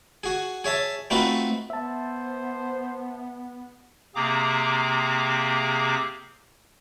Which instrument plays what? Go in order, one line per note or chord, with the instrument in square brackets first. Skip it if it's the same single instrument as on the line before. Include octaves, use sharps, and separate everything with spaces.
[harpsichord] F#4 G#4
G#4 C#5 E5 A5
A3 C4 D#4 F4 F#4 B4
[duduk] B3 [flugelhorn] C5 [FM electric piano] E5 A5
[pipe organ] C3 A#3 C4 G#4 A#5 D6